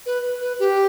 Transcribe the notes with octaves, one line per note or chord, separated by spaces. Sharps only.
B4
B4
G4